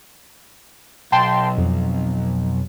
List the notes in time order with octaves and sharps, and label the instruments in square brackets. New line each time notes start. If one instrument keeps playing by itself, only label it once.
[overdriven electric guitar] B1 [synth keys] G5 A5 C6
[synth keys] F2